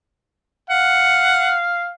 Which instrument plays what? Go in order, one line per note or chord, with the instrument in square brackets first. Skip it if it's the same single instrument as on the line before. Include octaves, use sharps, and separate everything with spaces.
[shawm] F5 [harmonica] F#5